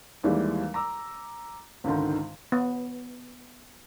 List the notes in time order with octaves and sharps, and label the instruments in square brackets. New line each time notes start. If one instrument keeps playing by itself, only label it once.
[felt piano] D#2 E3 G3 G#3
A#5 D6 E6
C#2 G#2 D3 D#3
[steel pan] B3